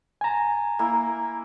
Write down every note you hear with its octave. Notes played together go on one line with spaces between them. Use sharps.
G#5 A#5
A#3 E4